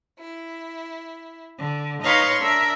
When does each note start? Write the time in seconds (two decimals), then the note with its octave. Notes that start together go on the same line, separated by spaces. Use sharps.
0.19 E4
1.58 D3
2.03 D#4 B4 C#5 F5 C6 C#6
2.41 D4 A#4 E5